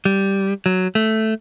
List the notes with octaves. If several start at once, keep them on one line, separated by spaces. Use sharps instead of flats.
G3
F#3
A3